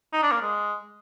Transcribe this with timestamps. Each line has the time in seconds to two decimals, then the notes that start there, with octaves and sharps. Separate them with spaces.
0.13 D#4
0.23 D4
0.32 A#3
0.42 G#3